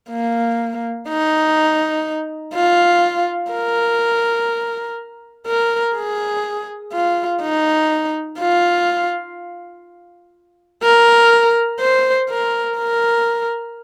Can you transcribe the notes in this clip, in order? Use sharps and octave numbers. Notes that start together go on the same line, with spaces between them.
A#3
D#4
F4
A#4
A#4
G#4
F4
D#4
F4
A#4
C5
A#4
A#4